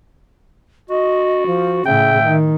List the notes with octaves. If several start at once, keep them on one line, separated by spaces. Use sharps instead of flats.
F#4 D#5
F3
A2 C#3 E5 G5
D#3